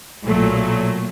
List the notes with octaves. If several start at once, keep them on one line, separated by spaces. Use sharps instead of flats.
B1 A#2 F#3 A3